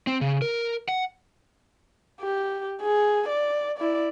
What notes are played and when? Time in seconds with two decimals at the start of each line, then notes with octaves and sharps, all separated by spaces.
0.07 C4
0.21 C#3
0.42 A#4
0.88 F#5
2.21 G4
2.82 G#4
3.29 D5
3.79 E4 D5